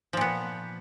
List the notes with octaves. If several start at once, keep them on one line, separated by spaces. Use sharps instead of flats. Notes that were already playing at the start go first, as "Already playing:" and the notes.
A#2 F3 B3